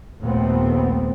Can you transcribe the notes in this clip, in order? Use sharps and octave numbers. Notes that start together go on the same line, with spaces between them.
A#1 D#2 A#2 A3 B3 C4